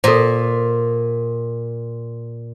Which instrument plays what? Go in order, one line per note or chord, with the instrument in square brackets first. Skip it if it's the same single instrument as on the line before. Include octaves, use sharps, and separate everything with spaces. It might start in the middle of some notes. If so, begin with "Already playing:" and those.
[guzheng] A#2 [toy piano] A4 C5